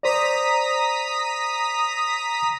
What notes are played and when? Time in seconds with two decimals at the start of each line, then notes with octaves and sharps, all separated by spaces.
0.03 C5 D5 A#5 D#6 B6